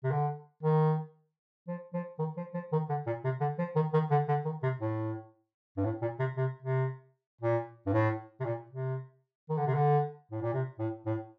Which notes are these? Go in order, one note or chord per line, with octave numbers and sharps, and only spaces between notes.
C3
D3
D#3
F3
F3
D#3
F3
F3
D#3
D3
A#2
C3
D3
F3
D#3
D#3
D3
D3
D#3
C3
A2
G2
A2
A#2
C3
C3
C3
A#2
G2
A2
C3
A#2
C3
D#3
D3
C3
D3
A2
A#2
C3
A2
A2